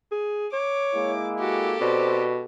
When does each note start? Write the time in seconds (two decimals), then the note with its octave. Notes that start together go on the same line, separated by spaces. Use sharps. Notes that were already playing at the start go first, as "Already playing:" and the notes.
0.11 G#4
0.53 C#5 D6
0.95 G#3 A#3 E4
1.40 F#4 G4 A4
1.81 B2 C4 D5